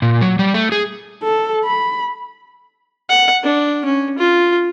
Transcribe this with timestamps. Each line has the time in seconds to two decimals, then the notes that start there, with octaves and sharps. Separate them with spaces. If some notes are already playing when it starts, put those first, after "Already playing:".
0.02 A#2
0.21 F#3
0.39 G3
0.54 A3
0.72 G#4
1.23 A4
1.64 B5
3.09 F#5
3.43 D4
3.85 C#4
4.19 F4